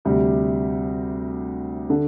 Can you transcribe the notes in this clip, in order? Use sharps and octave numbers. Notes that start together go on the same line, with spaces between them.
D2 C3 G3
D3